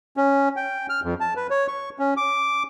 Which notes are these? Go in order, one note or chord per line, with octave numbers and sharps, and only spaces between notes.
C#4
G5
F6
F2
A5
B4
C#5
C#6
C#4
D6